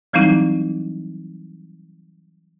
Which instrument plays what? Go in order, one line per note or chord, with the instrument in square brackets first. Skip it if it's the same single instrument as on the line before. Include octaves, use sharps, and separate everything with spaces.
[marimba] E3 F#3 G3 C4 D#4 E4